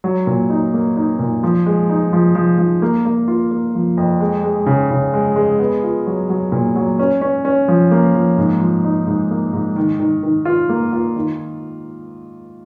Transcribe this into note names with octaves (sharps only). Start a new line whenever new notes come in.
F#3
A#2
D#4
A#3
D#4
A#2
F3
G#3
D#4
F3
F3
F3
A#3
A#3
F4
A#3
F3
F2
G#3
G#3
C#3
C#3
G#3
G#3
B3
F4
F#3
F#3
A#2
F#3
C#4
C#4
C#4
F3
A#3
F3
G#2
F3
D#4
G#2
A#3
G#2
D#3
D#3
D#3
F4
A#3
F4
D#3